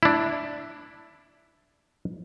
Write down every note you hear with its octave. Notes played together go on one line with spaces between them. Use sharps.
D4 E4